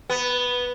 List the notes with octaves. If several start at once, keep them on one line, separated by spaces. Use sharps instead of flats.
B3